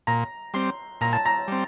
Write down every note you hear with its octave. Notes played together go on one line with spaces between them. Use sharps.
A#2 A#5
G3 C4 C6
A#2 A#5
A5
A#5
G3 C4